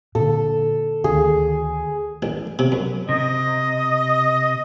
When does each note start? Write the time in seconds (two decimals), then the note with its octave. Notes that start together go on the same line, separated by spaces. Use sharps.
0.15 A#2 D3 A4
1.04 D2 D#3 G#4
2.22 A1
2.59 C3
2.72 F#2
3.09 C3 D#5